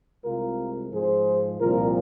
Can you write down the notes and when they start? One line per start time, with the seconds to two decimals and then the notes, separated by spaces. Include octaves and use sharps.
0.23 C2 C3 G#3 F4 A#4
0.91 G#2 F3 G#3 G#4 C5
1.59 C2 A#2 F3 F4 A#4